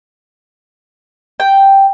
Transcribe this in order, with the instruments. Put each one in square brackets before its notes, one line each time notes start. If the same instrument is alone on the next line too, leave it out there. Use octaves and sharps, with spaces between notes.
[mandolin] G5